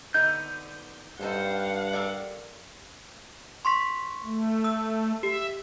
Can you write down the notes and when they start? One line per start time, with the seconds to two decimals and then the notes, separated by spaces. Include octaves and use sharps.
0.14 D3 B3 D#4 G6
1.21 G2 D#4 A4 C5 F5 F#5
1.93 A4 A#4 D5
3.65 C6 C#6 B6
4.24 A3
4.64 E6
5.23 G4 E5